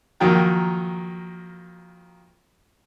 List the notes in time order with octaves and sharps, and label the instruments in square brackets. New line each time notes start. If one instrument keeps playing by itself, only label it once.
[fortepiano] F2 D#3 F#3 A#3 G5 A#5